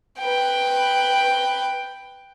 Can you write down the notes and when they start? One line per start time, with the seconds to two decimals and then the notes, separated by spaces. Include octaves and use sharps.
0.19 B4 G5